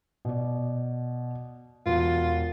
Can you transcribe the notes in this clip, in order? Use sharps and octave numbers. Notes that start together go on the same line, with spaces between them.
B2 D5
E1 B3 F4